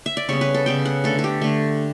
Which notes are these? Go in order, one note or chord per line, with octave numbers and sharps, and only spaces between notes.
E5
D5
C#3 G3 B3 C#5
B4
A4
C#3 G3 B3 G5
F#5
D3 A3 A4
A4
G4
D3 A3